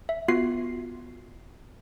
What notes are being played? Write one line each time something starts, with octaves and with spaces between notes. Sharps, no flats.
E5
B3 F4 F#4 C7